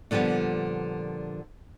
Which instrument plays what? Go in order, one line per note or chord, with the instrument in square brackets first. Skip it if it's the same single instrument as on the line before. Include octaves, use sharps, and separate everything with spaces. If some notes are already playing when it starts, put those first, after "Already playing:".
[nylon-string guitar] A#2 D3 F3 G3 B3